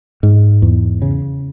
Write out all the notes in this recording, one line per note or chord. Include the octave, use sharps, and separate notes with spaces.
G#2
E2
C#3